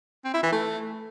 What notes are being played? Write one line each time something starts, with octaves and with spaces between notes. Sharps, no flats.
C4
E4
E3
A3